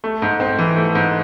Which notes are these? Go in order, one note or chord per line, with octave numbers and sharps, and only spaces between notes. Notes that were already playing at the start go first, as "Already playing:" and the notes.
A3
G#2
C4
E3
A3
G#2